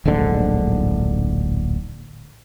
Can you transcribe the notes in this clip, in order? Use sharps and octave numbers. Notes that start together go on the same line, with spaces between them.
D1 A#1 G#2 D3